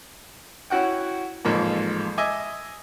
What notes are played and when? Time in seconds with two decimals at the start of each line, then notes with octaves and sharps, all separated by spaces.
0.70 C#4 E4 F#4 F#5 G5
1.45 A1 F2 G#2 F3 A#3
2.18 D#5 E5 G#5 D6